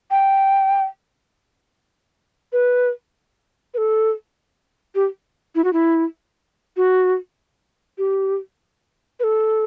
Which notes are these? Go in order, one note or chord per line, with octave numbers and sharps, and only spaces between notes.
G5
B4
B4
A4
G4
E4
F#4
E4
F#4
G4
B4
A4